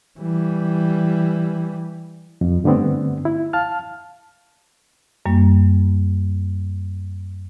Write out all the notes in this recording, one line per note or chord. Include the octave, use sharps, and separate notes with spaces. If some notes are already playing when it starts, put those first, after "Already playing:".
E3 G3
F2
G2 D3 A3 B3 C4
E4
F5 A5 F6
F#2 G3 A#3